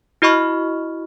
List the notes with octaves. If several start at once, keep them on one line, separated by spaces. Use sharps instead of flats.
E4 F#4 D#5 B5 C#6 F6